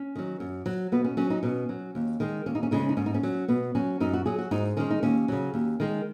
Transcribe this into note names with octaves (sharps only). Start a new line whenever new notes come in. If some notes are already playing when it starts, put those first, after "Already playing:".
Already playing: C#4
D#3 F#3
F#2
F#3
B2 B3
C#4
F#3 C#4
D#4
B2 C#4
F#3
D#2
D#3 G#3
D#2 C#4
D#4
C#4
C#3 G#3 D#4
C#4
D#4
G#2 C#4
D#4
C#4
F#3
B2 B3
F#3 C#4
F#2 D#4
F#4
F#3 G#4
F#4
G#2 D#4
D#3 G#3 C#4
D#4
D#2 C#4
C#3 F#3
D#2
D#3 G#3